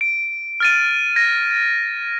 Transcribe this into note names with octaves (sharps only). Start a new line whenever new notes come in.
D7
F6 A6 D#7
G#6 A#6